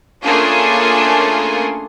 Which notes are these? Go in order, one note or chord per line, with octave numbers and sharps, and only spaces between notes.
A3 A#3 C#4 D4 F4 G#4